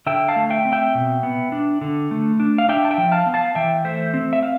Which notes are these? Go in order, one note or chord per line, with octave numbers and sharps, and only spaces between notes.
D3 E5 G5
F5 A5
A3
E5 G5
C4
E5 G5
B2
B3
D4
D3
A3
D4
F5
D4 E5 G5
A5
E5 G5
F3
F5 A5
B3
F5 A5
E3 E5 G5
A3 C5 E5
C4
E5
F5